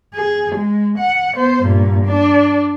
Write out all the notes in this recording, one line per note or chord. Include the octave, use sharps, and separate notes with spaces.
G#4
G#3
F#5
B3 C5
G2 A#2
D4